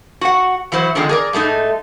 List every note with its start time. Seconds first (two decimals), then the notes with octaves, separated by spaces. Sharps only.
0.21 F#4 F#5
0.72 E3 F#3 E4 C5
0.95 D3 D#3 F3 G#3 C4
1.09 G#4 A#4 D5
1.33 A2 G#3 A3 D#4